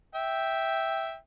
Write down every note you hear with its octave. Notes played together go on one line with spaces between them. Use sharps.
E5 G5